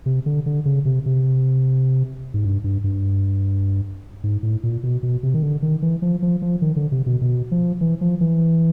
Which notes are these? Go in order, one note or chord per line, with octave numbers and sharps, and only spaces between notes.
C3
D3
D3
C#3
C3
C3
G#2
G2
G2
G2
G#2
A2
A#2
B2
B2
C3
D#3
D3
D#3
E3
F3
F3
F3
D#3
D3
C3
B2
B2
F3
E3
F3
E3